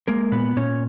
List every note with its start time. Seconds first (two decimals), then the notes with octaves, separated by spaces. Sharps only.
0.08 G#3 A#3 A#4
0.32 A#2 B3 B4
0.57 A#2 C#4 C#5